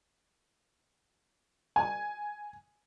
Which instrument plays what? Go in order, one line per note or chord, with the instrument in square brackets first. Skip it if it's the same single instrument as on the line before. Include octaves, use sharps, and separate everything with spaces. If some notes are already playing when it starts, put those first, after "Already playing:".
[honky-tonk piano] G#5